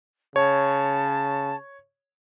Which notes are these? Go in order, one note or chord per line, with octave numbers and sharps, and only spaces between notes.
C#3 C#5 A5